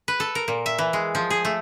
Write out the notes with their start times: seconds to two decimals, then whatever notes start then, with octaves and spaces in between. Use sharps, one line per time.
0.08 B4
0.20 A4
0.35 A#4
0.48 A#2
0.66 E5
0.78 E3
0.93 G#3
1.15 F3
1.30 G#4
1.45 A3